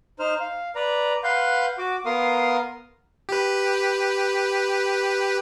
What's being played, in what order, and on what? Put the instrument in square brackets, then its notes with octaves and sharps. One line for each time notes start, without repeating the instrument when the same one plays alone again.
[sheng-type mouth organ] D#4 C5 F6
F5
B4 D5 A#5
B4 F5 F#5 C6 G6
F#4 D6
B3 A#4 F5 C6 D#6
[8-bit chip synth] G4 B4